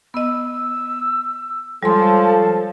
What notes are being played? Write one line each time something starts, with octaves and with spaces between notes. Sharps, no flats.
B3 D#5 E6
F3 G3 G#3 A4 C#5 C6